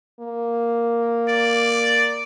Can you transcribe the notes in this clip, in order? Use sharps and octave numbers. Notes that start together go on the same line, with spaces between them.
A#3
D5